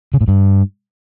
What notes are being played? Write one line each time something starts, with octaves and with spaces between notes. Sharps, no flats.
C#3
A2
G2